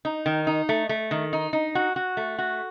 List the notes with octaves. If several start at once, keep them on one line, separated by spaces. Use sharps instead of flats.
D#4
D#3
D#4
A3
A3
D#3
D#4
D#4
F#4
F#4
A3
F#4